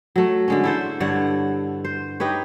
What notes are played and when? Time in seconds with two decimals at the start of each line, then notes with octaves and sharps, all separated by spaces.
0.16 F#3 A3
0.48 D3 G#3 C#4
0.64 E4 A4 C5
1.00 G2 D3 C#5 F#5
1.85 C5
2.20 D#4 G4 B4 C#5